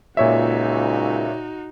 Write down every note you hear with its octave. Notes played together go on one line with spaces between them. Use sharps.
C#2 A#2 D#4 F#4 C#5 E5